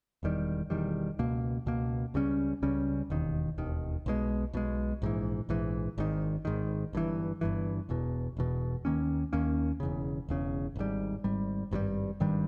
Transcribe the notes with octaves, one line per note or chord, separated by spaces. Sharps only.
E1 E2 D#3 G3
E1 E2 D#3 G3
C#2 B2 A#3
C#2 B2 A#3
C#2 C#3 G3 C#4
C#2 C#3 G3 C#4
E1 D#2 D#3
E1 D#2 D#3
B1 B2 G#3
B1 B2 G#3
A#1 G#2 E3
A#1 G#2 E3
G#1 G#2 D#3
G#1 G#2 D#3
G1 G2 E3
G1 G2 E3
E1 E2 B2
E1 E2 B2
D#2 D#3 A#3 C#4
D#2 D#3 A#3 C#4
E1 E2 C#3
E1 E2 C#3
G#1 G#2 G3
G#1 G#2 G3
G#1 G2 D#3 G3
G#1 G2 D#3 G3